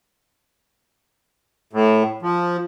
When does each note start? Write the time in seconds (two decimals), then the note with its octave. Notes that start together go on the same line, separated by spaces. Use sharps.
1.73 A2
2.22 F3